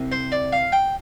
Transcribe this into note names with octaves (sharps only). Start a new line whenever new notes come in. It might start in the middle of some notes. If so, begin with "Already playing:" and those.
Already playing: C2 C3
C5
D5
F5
G5